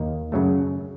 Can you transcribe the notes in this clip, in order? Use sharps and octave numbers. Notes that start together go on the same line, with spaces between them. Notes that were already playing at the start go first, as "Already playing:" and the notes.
Already playing: D#2 D#3 A#3 D#4
F#2 C#3 F#3 A3